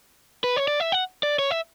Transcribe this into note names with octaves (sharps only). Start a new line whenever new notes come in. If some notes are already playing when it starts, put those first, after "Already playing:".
B4
C#5
D5
E5
F#5
D5
C#5
E5